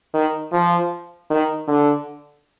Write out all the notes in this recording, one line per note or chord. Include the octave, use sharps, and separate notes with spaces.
D#3
F3
D#3
D3